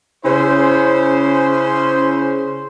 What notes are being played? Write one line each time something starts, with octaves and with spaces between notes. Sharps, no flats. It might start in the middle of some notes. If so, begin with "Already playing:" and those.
C#3 C#4 E4 C5